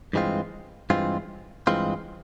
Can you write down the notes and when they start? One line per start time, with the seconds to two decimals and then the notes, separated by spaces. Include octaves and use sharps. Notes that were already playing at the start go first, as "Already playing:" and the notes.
0.13 G2 E3 G#3 C4 F4
0.90 G2 E3 G#3 C4 F4
1.67 G2 E3 G#3 C4 F4